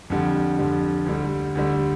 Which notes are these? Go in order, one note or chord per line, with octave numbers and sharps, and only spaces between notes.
F2 D3 G3
F2 D3 G3
D2 D3 G3
D2 D3 G3